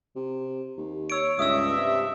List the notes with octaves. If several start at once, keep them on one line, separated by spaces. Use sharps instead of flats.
C3
D#2
C#5 E6 D7
C#2 G2 E5 D#6 E6
C3